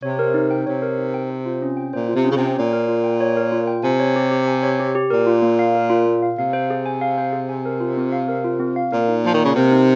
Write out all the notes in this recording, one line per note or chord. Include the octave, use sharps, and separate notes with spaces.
C3 C#5
A#4
D#4
G5
C3 C#5
A#4
D#4
G5
C5
F4
C#4
G5
A#2 C5
F4
C3
C#4
C#3
C3 G5
A#2 C#5
A#4
F4
G5
C#5
A#4
F4
G5
C3 G#5
C#5
G4
G4
G#5
C#5
G4
G4
A#2 A#4
F4
A#3
F5
A#4
F4
A#3
F5
C3 F5
C5
G#4
G#5
F5
C5
G#4
G#5
A#4
F4
C4
F5
A#4
F4
C4
F5
A#2 A#4
D#4
F3 A#3
D#3
C#3 A#3
C3 A#4
D#4